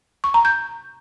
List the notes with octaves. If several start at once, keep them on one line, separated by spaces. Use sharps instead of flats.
C#6
A#5
G6